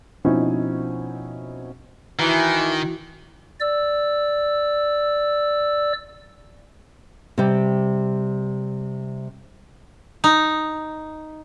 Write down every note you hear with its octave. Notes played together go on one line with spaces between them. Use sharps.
B2 F3 C4 C#4 D#4 E4
D#3 E3 E4 F#4
D5 E6
C3 G3
D#4